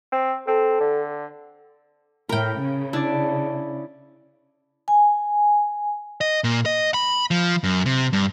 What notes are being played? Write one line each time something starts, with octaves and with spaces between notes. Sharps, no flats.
C4
C4 A4
D3
A2 A#4 G5 B5
C#3
D4 E4 D5
G#5
D#5
A#2
D#5
B5
F3
F#2
C3
G2